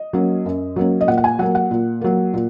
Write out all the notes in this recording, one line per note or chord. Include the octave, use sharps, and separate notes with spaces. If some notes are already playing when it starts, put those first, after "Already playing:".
Already playing: D#5
F#3 A#3 C#4
F#2
F#3 A#3 C#4
D#5
A#2 F#5
F#5
G#5
F#3 A#3 F#5
F#5
A#2
F#3 A#3
A#2